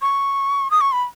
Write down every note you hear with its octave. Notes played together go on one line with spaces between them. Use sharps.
C#6
D#6
C#6
B5